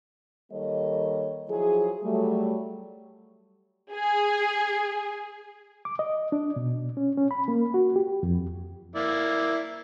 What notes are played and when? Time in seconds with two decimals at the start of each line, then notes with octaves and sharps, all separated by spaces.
0.51 D#3 G3 A#3 A4 C#5 D#5
1.48 F3 F#3 E4 G#4
2.04 F#3 G3 A3
3.92 G#4
5.85 D6
5.99 D#5
6.32 D4
6.56 B2
6.97 C#4
7.17 C#4
7.31 B5
7.48 A#3
7.74 F#4
7.96 G4
8.23 F2
8.95 A#3 E4 D5